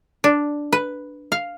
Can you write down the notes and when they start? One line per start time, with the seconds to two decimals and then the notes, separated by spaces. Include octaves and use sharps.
0.24 D4
0.72 B4
1.32 F5